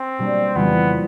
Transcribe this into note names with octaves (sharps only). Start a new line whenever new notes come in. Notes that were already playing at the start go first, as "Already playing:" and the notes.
Already playing: C4
B2 G3 A#3 D4
F2 C#3 E3 G3 B3